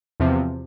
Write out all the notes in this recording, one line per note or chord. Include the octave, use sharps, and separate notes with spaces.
E2 C3 F3